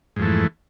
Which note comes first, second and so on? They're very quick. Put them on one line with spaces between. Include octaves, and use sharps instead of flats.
G#2 F2 A3 E3